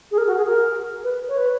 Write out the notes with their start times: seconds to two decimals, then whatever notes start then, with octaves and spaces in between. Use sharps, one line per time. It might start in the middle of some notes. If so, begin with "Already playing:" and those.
0.11 G#4
0.18 A#4
0.27 F#4
0.37 G#4
0.46 A#4
1.04 B4
1.28 C#5
1.38 B4